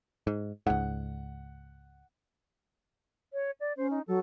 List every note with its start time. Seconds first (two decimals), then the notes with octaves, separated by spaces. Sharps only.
0.27 G#2
0.67 C#2 G#2 F#5
3.33 C#5
3.60 D5
3.77 C#4 C5
3.91 D#4
4.07 F#3 A4